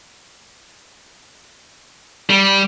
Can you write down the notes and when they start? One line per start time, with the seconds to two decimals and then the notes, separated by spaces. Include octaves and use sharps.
2.30 G3